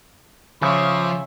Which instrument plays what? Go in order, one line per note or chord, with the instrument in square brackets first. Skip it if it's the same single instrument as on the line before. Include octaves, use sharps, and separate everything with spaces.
[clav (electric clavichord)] C#3 [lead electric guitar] F3 F4 [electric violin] C#5 E5 [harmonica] C6 D6